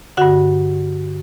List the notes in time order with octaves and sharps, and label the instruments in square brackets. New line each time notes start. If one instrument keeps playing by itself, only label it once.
[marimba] G2 D3 F#4 F#5